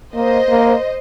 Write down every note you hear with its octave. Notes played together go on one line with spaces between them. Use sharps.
A#3 C5 D#5
A#3